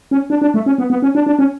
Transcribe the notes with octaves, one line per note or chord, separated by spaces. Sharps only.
C#4
D4
D4
A3
C#4
B3
B3
C#4
D4
D4
C#4